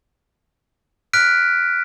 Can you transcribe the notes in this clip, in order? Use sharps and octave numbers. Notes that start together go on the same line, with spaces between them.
F6 F#6 B6 D7